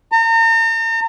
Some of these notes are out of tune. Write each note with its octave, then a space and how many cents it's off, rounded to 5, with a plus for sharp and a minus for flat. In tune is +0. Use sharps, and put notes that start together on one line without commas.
A#5 -40